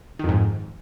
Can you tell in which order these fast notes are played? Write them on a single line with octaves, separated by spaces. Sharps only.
D#3 F2 G#2